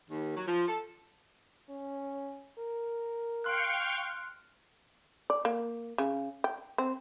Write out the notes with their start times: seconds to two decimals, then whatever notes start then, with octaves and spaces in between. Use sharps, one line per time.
0.09 D#2
0.35 F#3
0.47 F3
0.67 A4
1.70 C#4
2.59 A#4
3.44 F5 G5 C6 C#6 F6 F#6
5.30 D5
5.45 A#3
5.98 C#3
6.44 G5
6.78 C4